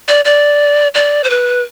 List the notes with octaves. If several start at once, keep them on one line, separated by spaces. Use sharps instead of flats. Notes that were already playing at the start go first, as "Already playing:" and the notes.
D5
D5
D5
C5
B4